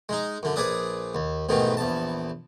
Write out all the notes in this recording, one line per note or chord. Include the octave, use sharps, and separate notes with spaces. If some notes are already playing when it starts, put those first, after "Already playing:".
G#3 D#4
F#2 D3
A#1 G#4 B4 D5 D#6
D#2
A1 G#2 B2 D#3 E3
A#1 E2 A5